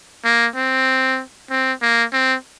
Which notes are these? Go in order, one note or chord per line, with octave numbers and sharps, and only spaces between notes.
A#3
C4
C4
A#3
C4